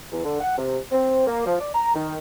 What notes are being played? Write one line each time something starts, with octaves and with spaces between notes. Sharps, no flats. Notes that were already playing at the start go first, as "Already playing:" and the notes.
E2
D3
F#5
C3
C4
A#3
F3
D5
A#5
D#3